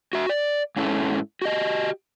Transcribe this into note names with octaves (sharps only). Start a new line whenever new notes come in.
F#4 E5
D5
G#2 C#4 E4 A4
F#4 G4 D#5